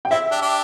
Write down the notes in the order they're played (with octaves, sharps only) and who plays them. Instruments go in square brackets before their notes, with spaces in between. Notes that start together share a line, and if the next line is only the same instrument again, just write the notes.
[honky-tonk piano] G5
[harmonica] C4 E4 [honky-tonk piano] E5
[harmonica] D4 G4
D4 G4